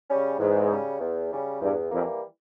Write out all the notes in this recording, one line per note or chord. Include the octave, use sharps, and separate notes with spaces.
C#3 G3 C#4
E2 G#2
C#3 G3 C#4
E2
C#3 G3 C#4
E2 G2
F2 E3 G3 A#3